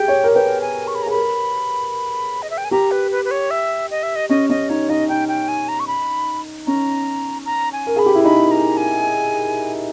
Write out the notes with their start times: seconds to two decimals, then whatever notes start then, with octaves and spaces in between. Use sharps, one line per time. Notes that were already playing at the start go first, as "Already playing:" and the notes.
Already playing: G4 G#4 G5
0.08 C#5
0.24 A#4
0.35 B4 G5
0.61 G#5
0.87 C#6
0.95 B5
1.03 A#5
1.06 G#4
1.11 A#4 B5
2.42 D#5
2.50 E5
2.58 G5
2.65 G#5
2.71 G4 A#5
2.91 B4
3.11 B4
3.25 B4
3.31 C#5
3.51 E5
3.91 D#5
4.03 E5
4.16 D#5
4.29 C#4 D#5
4.50 C#4 D#5
4.69 D#4 C#5
4.89 D#4 D#5
5.09 D#4 G5
5.28 G5
5.48 G#5
5.69 A#5
5.80 C#6
5.87 B5
6.67 C#4 A#5
7.46 A#5
7.73 G#5
7.87 A#4
7.96 G#4 B5
8.06 G4
8.15 E4
8.24 D#4 B5
8.51 A#5
8.77 G#5